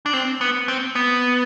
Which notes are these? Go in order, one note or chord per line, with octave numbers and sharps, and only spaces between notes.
D4
C4
B3
C4
B3